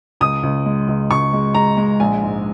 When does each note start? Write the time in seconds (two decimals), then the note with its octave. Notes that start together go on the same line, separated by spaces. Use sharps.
0.21 C#2 D#6
0.43 C#2
0.66 G#3
0.88 C#2
1.10 C#2 C#6
1.33 G#3
1.54 G#3 A#5
1.77 G#3
2.00 A#1 G#5
2.23 G#2